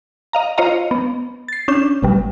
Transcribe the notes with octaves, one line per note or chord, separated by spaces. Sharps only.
D#5 F5 A#5
F4 C5 C#5 D#5 F5 A#5
B3
A6 C7
C#4 D4 G6 E7
A1 B2 G3